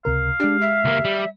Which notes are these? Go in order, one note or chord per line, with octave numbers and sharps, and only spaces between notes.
C#2 C3 A#4 F5
G#3 D4 G4
E5
C#2 A#3
G3